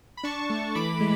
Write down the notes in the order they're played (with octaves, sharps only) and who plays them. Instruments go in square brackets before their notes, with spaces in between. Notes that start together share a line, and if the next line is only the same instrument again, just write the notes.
[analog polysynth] B5
D4 A5 C#6
A3
E3 B5 D6
G#3